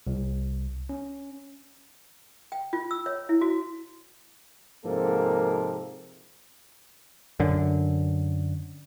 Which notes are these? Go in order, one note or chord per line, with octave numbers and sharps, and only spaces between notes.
C2
C#4
G5
F4
E6
C#5
E4
F#4
G#2 C3 F3 A#3 A4 A#4
F#2 D3